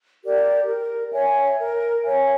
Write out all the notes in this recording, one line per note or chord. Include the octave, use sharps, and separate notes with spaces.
G4 A#4 D5
A#4
C#5 E5 G#5
A#4
C#5 E5 G#5